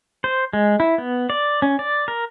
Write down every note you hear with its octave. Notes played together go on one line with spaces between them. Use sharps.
C5
G#3
E4
B3
D5
C#4
D5
A#4